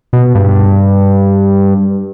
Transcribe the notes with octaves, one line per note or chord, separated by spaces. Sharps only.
B2
G2